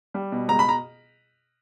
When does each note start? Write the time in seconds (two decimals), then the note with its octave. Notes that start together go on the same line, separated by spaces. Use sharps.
0.14 G3
0.32 B2
0.49 C#2 A#5
0.59 B5
0.69 A#5